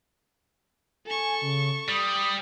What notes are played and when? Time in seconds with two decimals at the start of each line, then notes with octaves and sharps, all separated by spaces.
1.06 A4 G#5 C#6
1.42 C#3
1.89 G3 D#6